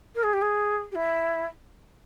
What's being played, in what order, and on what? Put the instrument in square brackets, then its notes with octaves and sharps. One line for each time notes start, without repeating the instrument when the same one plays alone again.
[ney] A#4
G#4
G4
G#4
G4
E4